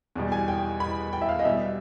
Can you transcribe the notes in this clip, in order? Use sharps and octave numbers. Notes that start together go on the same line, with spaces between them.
E2 B2 G3
G#5
G5
B5
G5
E5
F5
D#5
B2 G3 E5